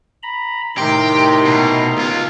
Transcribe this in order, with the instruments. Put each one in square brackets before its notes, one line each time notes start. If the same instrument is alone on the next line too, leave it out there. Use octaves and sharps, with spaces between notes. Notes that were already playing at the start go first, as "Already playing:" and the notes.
[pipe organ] A#5 B5
[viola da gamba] A2 D#3 [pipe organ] C3 A#5 C6 [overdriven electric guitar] G4
[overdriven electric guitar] B2
[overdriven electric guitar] C#2 F4 [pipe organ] F5